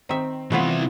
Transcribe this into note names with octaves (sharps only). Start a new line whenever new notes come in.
D#3 C4 E5
C3 E3 F3 A3 B3 E4 F4